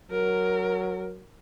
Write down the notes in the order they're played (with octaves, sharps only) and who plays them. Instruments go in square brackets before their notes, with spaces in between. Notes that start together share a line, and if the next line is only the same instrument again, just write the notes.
[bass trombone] F#3 [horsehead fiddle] A#4